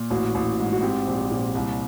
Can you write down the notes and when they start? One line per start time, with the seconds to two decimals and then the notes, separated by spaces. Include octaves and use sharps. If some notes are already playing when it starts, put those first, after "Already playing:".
Already playing: A#2
0.10 A1 F#4
0.35 A1
0.59 G#2
0.73 F#4
0.83 C4 G4
1.07 A#1
1.31 A#2
1.55 C2